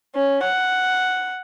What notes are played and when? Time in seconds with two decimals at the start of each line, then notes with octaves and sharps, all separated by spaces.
0.15 C#4
0.45 F#5